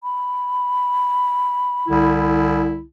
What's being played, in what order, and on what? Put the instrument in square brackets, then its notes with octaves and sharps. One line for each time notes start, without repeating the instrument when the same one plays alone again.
[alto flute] B5
[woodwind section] C2 D3 E4